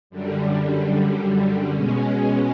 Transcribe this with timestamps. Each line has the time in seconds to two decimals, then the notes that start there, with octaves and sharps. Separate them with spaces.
0.10 F#2 D3 G3
1.72 B2 G#3 C#4